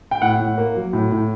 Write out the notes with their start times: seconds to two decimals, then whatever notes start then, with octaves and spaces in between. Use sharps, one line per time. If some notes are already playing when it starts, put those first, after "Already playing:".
0.11 G5
0.21 A2 F#5
0.39 A2
0.58 A#3
0.75 F#3
0.93 A2
1.12 A2